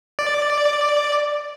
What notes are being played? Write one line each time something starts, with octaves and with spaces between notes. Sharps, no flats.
D5